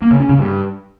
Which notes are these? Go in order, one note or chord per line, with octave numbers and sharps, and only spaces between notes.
A#3
C#3
C#4
C#3
G2